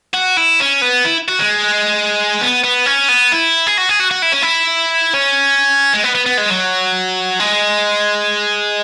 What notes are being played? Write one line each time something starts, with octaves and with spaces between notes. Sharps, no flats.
F#4
E4
C#4
B3
E4
F#4
G#3
B3
B3
C#4
B3
E4
G#4
F#4
G#4
F#4
F#4
E4
C#4
E4
C#4
G#3
B3
B3
B3
G#3
F#3
G#3